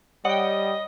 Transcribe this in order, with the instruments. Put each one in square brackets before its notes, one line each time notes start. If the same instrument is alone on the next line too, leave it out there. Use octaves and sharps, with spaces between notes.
[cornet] G3 [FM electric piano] C#5 D#6 [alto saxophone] D#5 [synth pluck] F#5 G5